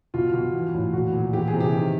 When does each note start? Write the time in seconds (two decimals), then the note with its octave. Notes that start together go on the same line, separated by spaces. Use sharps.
0.14 B2 F4
0.34 B2
0.54 E3
0.74 A2
0.93 A#2 F#4
1.13 A#2
1.33 E3 G4
1.48 G#4
1.53 C3
1.60 G4
1.73 D#3